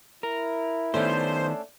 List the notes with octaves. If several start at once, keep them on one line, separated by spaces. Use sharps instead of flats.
E4 A#4
D#3 A3 B3 C#4 D4 C5